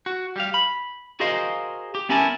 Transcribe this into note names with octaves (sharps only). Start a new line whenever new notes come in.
F#4
G3 G4 F5
B5
F#4 G#4 A#4 C5 D#5 F5
G4
B3 C#4 E4 A#4 G#5 A5